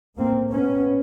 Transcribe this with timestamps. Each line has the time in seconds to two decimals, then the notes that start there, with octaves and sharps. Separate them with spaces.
0.17 A2 A#3 C4
0.52 B3 C#4